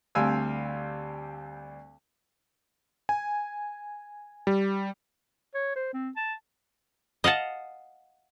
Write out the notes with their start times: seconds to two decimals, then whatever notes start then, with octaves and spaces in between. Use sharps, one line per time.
0.15 D2 G3 C4 F5 G#5 E6
3.09 G#5
4.47 G3
5.55 C#5
5.76 C5
5.94 C4
6.16 A5
7.24 D#5 F5 F#5 A5